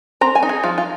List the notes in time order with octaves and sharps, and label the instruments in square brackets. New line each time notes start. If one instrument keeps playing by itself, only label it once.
[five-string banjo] C4 A#5
G#5
D#4
G#4
F3 F4
F4